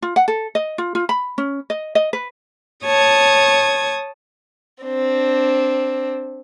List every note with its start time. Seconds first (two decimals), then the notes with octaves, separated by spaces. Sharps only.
0.02 F4
0.16 F#5
0.28 A4
0.55 D#5
0.78 F4
0.95 F4
1.09 B5
1.38 C#4
1.70 D#5
1.95 D#5
2.13 B4
2.86 C#5 A5 D#6 G#6
4.83 C4 D4